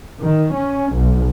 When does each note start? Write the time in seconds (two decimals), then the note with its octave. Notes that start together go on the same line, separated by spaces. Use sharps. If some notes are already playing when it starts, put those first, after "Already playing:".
0.22 D#3
0.55 C#4
0.95 B1